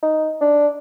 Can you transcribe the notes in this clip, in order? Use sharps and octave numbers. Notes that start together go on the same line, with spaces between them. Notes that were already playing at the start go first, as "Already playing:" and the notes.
D#4
D4